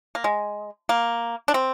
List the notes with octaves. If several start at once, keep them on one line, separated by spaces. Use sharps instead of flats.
A#3
G#3
A#3
D4
C4